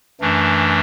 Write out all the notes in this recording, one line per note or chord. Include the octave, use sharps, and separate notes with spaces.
F#2 E3 A3 D4